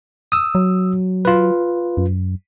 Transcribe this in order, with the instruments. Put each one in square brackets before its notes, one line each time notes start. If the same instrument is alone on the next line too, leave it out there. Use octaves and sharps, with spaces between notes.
[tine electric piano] D#6 E6
[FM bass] F#3
[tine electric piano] F4 B4
[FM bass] F#2